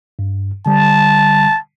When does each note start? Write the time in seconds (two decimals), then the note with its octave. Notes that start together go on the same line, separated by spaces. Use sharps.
0.19 G2
0.66 D3 G3 A5